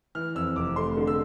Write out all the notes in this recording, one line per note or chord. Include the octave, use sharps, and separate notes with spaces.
E3 F6
F2 E6
F1 D6
A3 C6
D3
E6